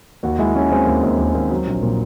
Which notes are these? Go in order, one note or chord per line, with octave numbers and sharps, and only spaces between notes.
D#2 F#4
G#3 E4
G#3 C#4
G#3 C4
D#2
D#2
D#2
D#2
F#3
A#1
A#2